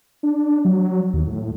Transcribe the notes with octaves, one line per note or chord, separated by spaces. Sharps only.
D4
F#3
D#2
A2